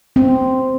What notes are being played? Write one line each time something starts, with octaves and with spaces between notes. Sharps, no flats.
C4